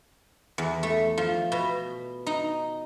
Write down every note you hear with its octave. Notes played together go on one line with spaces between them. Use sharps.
E2
A3
F3
B2
D#4